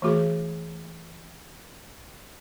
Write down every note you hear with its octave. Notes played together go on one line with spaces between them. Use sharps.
E3 A3 F#4 G#4